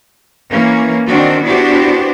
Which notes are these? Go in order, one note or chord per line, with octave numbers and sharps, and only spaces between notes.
E3 A#3 C#4
D#3 C4 D4 F#4
B3 D4 E4 F#4 G4 C5